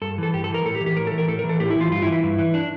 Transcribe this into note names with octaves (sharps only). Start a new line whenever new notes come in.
G2 A4
E3 A4
G2 G4
A4
E3
A#4
A2 A4
G4
E3
G4
A2 A#4
A4
E3
A#4
A2 A4
A#4
E3
A4
A2 G4
E4
E3
F4
G2 F4
E4
E3
E4
G2
E3
D4